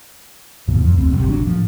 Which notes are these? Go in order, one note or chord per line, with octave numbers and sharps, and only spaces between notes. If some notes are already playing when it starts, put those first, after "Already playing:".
D#2 G#2 B2 E3
F2
F1 D2 C4
G1 C3 F#3
G1 F#3 C4 D4
A2 F3